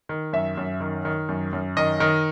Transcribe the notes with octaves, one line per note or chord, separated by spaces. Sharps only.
D#3
F#2 E5
F#2
D#3
D#3
F#2
F#2
D#3 D#5
D#3